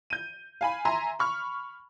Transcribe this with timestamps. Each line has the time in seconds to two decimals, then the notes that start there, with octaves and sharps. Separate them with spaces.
0.10 G6 D#7
0.61 F5 G#5 B5
0.85 E5 G#5 A#5 C6
1.19 B5 C#6 F6